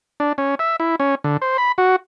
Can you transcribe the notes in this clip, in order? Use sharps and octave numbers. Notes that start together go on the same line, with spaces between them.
D4
C#4
E5
E4
C#4
D3
C5
B5
F#4